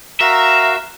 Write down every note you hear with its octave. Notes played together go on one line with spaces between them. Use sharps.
F#4 A#4 E5 F5 A#5